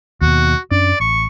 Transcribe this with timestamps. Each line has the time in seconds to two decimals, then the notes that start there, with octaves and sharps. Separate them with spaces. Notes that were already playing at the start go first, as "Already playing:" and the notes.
0.22 D#2 B2 F#4
0.71 F#2 C#4 D4 D5
1.00 A1 C#6